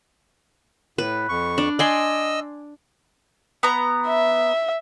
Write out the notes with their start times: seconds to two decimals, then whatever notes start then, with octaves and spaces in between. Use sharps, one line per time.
0.98 A2 B4
1.29 F2 C#6
1.58 D4
1.79 D5 D#5 G#5 C6 E6
3.63 B3 A#5
4.07 E5